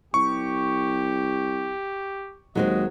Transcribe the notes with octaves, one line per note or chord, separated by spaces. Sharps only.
C2 G4 C#6
D#2 F#3 G#3 C4 D#5